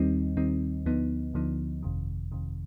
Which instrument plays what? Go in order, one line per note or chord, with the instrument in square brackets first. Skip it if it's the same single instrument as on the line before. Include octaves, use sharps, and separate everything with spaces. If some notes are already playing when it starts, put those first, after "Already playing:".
Already playing: [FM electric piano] D#2 D#3 G3 C4 D#4
D#2 D#3 G3 C4 D#4
D2 D3 F3 B3 D#4
D2 D3 F3 B3 D#4
G1 F2 C3 D#3
G1 F2 C3 D#3